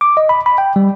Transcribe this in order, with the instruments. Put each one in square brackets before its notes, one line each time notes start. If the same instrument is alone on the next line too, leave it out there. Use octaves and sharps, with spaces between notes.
[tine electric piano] D6
D#5
B5
B5
G5
G3